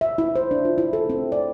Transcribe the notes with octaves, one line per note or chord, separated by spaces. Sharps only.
E5
E4
C5
D4
F4
E4
A4
C4
D5